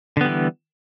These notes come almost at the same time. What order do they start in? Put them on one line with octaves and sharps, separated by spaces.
D3 B3 G3 E3